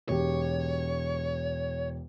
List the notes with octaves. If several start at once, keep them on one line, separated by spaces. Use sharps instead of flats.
E1 G4 C#5